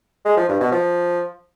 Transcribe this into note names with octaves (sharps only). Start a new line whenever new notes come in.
G#3
F3
G2
B2
F3